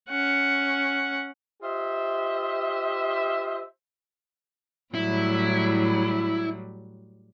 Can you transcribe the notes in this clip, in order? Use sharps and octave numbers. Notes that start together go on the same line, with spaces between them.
C#4 F#5
F4 G4 C5 D#5 E5
A2 F#3 G3 E4